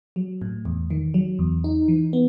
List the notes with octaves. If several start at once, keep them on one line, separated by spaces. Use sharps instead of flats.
F#3
A2
E2
D#3
F#3
E2
D#4
E3
B3